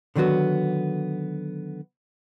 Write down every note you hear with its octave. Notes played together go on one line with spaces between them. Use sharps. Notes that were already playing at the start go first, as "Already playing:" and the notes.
D3 D#3 F#3 B3 F#4